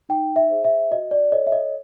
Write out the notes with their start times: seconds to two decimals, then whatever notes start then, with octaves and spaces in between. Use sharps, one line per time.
0.09 D#4 G5
0.36 E5
0.50 G#4 C5
0.64 E5
0.91 F#4 D#5
1.11 D5
1.32 A4 C#5 D#5
1.47 E5
1.52 D#5